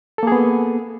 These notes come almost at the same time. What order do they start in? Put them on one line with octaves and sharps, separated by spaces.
A4 A#3 G#4 B3